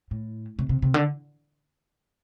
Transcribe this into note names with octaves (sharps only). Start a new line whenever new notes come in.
A2
C3
C3
C3
D3